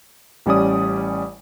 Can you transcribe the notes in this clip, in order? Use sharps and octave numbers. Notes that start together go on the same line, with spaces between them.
A1 G3 C#4 D5 D#6